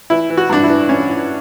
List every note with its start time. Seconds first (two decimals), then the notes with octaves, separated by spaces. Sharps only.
0.10 E3 E4
0.30 E3
0.37 F#4
0.50 G2 D4
0.63 E4
0.70 E3
0.89 E3 C#4
1.10 E3